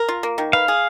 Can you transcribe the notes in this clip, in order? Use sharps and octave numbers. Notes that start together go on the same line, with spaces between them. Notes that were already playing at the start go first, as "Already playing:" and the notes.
Already playing: A#4
F4
A#3
D#3
B4 F5
G#4